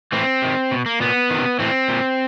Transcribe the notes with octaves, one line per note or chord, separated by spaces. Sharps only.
A2 E3 C4
C3 D#3
B2
A#3
A#2 B3
C3 D#3
A2 E3 C4
A#2